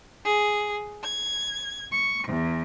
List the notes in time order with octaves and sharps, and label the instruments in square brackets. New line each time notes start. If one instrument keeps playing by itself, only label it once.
[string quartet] G#4
G#6
C#6
E2